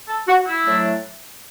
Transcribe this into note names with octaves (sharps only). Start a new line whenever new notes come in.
A4
F#4
E4
A2 F#3 A3 D4